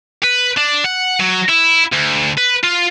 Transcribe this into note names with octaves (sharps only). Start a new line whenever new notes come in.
B4
D4
F#5
F#3
E4
D2
B4
F4